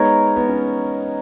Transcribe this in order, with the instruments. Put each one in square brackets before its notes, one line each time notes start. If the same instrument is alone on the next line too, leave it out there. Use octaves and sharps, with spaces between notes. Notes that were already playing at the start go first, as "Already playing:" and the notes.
Already playing: [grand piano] G#3 B3 [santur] D#4 A#4 C#5
[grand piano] B3
C#4